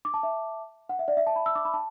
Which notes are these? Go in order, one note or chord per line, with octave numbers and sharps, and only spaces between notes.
D6
A5
E5
F#5
E5
D5
E5
A5
B5
E6
D6
B5
A5